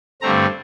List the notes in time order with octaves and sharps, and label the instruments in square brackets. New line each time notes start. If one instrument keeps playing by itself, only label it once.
[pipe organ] G2 D3 A3 C4 A#5